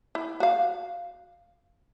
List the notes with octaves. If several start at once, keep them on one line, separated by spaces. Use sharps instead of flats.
E4
F#4 F5